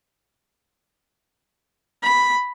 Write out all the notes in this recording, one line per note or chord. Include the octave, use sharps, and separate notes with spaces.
B5